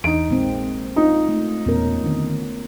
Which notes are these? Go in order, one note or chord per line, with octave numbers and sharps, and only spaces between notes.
E2 D#4 D7
A#1 G#3 A#3 C4
D#4 F4
A3
E1 E2 A#2 B3 C#4 A#4
D3 D#3 C4